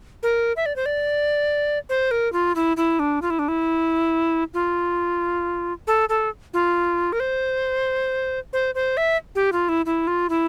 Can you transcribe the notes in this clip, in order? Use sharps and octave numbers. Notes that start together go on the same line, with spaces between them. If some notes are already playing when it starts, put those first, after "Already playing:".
A#4
E5
D5
C5
D5
C5
A#4
F4
E4
E4
D4
F4
E4
D4
E4
F4
A4
A4
F4
A#4
C5
C5
C5
E5
G4
F4
E4
E4
F4
E4